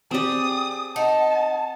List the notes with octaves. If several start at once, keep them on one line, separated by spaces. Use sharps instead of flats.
C4 G4 G#4 D5 D#6
D#4 F#5 A5